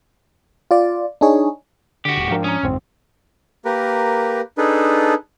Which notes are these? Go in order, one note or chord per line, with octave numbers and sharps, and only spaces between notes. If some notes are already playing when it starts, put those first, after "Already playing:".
F4 D5
D4 D#4 G#4 C#5
D3 F#4 G4
D#1 A2
G#2 F3 D4 A#4 F5 G5
C#4 A#5 D#6
A1 F2 G#2 D3 C4
A#3 G4 A#4 B4
D4 D#4 G#4 A4 B4